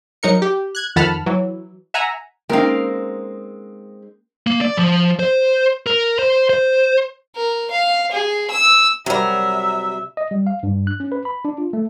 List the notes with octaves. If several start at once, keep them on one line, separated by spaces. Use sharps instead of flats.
F#3 D#4 A#4 C#7
G4
F#6 G#6
F2 D#3 F#5 A5 B5 F6
E3 F#3
E5 F#5 G#5 A#5
G#3 A#3 C4 C#4 D#4 A#4 F5 G5
A#3
D5
F3
C5
A#4
C5
C5
A#4
F5
G#4
E6
C3 F#3 G3 A#4 E5
D#5
G3
F5
G2
F#6
C#4
B4
B5
D4
F4
A3